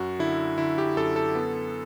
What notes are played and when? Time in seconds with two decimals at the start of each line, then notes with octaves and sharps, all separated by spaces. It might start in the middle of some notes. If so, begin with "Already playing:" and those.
Already playing: F#2 F#4
0.19 D3 E4
0.58 D3 E4
0.78 G4
0.97 F#2 A4
1.16 A4
1.35 B3